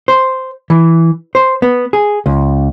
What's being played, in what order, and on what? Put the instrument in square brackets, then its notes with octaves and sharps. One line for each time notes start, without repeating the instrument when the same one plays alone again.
[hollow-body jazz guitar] C5
E3
C5
B3
G#4
C#2